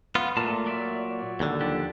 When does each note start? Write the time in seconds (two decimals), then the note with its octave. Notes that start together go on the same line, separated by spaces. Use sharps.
0.15 B3 F4
0.37 A#2 A3 A5
0.66 F#3 D5 E5
1.40 D#2 D3
1.61 F3 D4 G4